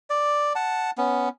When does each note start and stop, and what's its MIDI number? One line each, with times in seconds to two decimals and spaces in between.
0.10 0.53 74
0.55 0.91 78
0.55 0.91 81
0.98 1.29 59
0.98 1.29 61